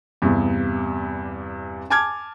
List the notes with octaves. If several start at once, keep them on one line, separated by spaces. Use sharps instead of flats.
E2 G2 C3
G#5 A5 D6 F6 G#6